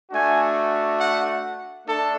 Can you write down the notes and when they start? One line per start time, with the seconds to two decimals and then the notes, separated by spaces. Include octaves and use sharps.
0.12 A3 D4 F#4 G#5
0.98 F#5
1.86 A3 D4 A4